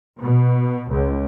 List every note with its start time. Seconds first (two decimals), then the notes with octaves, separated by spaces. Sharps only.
0.20 B2
0.90 C#2